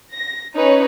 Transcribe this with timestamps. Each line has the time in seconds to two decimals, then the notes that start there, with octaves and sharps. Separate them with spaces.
0.13 A#6
0.56 C#4 D#4 B4 C#5